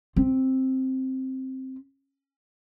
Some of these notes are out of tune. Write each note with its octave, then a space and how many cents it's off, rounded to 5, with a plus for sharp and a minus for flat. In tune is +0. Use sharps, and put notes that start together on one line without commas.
C4 +5